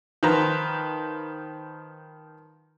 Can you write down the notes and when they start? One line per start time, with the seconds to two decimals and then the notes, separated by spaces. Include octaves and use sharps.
0.23 D#3 F3 B4 A#5